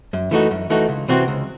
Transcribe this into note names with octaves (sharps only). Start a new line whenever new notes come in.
F#2
E3 A3 D#4 F#4
F#2
E3 A3 D#4 F#4
C#2
C3 E3 C4 F#4
C#2